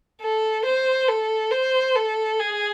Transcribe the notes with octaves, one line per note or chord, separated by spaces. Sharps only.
A4
C5
A4
C5
A4
G#4